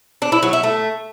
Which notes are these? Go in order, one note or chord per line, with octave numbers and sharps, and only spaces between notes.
D4
E4
F#3
E4
A3